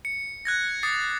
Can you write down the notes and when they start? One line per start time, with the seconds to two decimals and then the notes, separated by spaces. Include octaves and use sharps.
0.05 C#7
0.45 F#6 G#6 A#6
0.83 D6 D#6 A6 C7